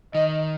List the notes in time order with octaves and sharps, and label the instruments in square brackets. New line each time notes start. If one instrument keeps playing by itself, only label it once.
[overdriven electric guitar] D#3 [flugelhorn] D#5